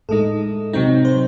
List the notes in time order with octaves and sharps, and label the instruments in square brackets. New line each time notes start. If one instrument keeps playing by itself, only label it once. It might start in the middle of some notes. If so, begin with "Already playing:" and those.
[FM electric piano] A2 G#3 D#4 A4
C3 F#3 C4 D#4
C5